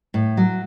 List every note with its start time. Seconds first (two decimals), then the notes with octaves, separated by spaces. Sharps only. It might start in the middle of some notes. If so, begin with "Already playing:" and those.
0.14 A2
0.37 F#3